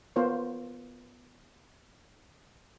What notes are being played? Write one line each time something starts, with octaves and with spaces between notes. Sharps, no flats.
B3 F4 A#4 C5 C#5